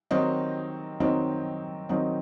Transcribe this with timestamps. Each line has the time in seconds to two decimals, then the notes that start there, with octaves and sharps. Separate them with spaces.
0.11 D#3 F#3 C4 D#4
1.00 D#3 F#3 C4 D#4
1.89 D#3 F#3 C4 D#4